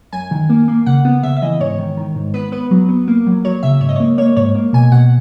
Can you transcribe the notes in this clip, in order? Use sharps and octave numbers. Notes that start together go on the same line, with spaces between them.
F#2 G#5
D#3
A#3
A#3
C#3 F#5
B3
C#3 E5
E5
E3 D#5
G#2 C#5
D#3
D#3
G#2
B3 B4
B3 B4
F#3
B3
A#3
F#3
F#3 C#5
C#3 E5
G#2 C#5
D#5
A#3 C#5
A#3 C#5
G#2 C#5
A#3
B2 G#5
B2 F#5